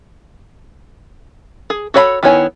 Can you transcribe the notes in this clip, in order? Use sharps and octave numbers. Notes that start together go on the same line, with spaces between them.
G#4
F#4 A4 C#5 F5 B5
D#3 B3 E4 C#5 G#5